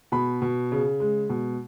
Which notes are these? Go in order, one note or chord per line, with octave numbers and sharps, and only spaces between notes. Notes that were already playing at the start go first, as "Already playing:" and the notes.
B2 B5
B2
C#3
G#3
B2